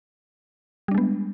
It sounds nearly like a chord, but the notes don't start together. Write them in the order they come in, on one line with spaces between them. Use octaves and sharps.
G3 D4 G#3 B3